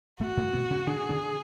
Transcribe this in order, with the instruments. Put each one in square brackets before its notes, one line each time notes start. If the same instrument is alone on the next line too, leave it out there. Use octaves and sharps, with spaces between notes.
[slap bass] A2 A3 [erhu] F#4
[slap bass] A2 A3
B2 B3
C#3 C#4
[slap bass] D3 D4 [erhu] G#4
[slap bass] D3 D4